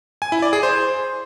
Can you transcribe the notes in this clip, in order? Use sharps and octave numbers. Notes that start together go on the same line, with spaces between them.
G#5
E4
D5
G#4
C5